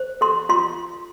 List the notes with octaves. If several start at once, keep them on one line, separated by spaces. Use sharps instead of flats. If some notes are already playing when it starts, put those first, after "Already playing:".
Already playing: C5
A4 C6
F4 C6